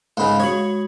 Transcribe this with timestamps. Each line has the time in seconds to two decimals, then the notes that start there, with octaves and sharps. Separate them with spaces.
0.17 G#2 C#3 F5 B5
0.40 G#3 F#4 C#5